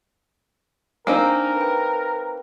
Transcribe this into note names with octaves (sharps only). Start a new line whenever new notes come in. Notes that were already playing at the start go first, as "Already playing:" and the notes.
A#3 C4 D4 D#4 A#4 G#5
B4 G5